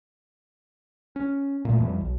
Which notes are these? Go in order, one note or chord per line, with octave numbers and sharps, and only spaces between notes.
C#4
A#2 A3
F2 E3 G3
B1